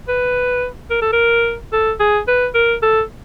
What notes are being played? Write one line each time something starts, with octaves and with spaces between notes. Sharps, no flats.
B4
A#4
A4
A#4
A4
G#4
B4
A#4
A4